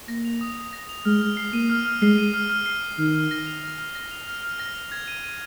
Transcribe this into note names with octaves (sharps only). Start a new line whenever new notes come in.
A#3 A#6
F7
D#6
D#6
A#6
F7
G#3 F6
F6
C7
A#3 D#7
F6
F6
G#3 C7
D#7
F6
F6
C7
D#7
D#3 F6
F6
A#6
F7
F6
F6
A#6
F7
F6
F6
A#6
F7
G#6
D#7
D#7